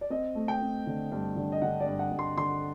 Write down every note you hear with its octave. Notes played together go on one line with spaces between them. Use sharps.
D5
C4 D#5
A3
G5
C4
D3
G2
D3
D#5
D3 F#5
D5
G2
F#5
G2
C6
D3 C6